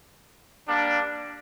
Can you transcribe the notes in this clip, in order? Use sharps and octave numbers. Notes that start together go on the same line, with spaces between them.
G3 A#3 D4